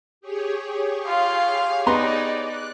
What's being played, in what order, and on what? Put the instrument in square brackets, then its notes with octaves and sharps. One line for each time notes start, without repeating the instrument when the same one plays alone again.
[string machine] G4 G#4 C#5
[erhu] F4 [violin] F5
[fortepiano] B3 A#5 C6 [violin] D#4 [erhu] D5
[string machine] F#6